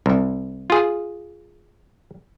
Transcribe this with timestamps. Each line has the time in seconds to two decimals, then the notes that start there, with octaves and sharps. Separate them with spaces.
0.06 C2
0.70 F4 G#4